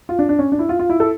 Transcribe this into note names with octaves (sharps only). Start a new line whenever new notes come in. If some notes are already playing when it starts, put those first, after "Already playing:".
F4
D4
D4
C#4
D4
E4
F4
F4
E4
A4